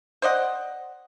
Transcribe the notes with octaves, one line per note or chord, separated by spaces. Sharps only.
C5 D5 D#5 F#5